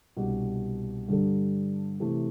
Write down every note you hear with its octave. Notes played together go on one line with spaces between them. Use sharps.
C2 B2 G3 D4 G4
G2 D3 G3 D4 A4
C3 E3 A3